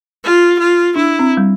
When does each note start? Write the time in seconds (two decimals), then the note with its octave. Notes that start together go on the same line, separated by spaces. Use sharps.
0.23 F4
0.59 F4
0.96 D4 E4
1.19 C4
1.37 G3